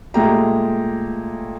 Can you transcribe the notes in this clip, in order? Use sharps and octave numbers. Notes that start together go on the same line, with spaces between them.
A#2 G#3 A3 G4 A#5